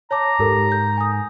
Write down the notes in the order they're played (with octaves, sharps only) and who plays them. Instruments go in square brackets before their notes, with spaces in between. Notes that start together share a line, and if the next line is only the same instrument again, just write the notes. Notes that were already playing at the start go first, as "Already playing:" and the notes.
[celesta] C#5 A5 D6 [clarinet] A#5
[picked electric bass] G#2 [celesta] G4 A4 A#4
[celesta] G6
G#5 D#6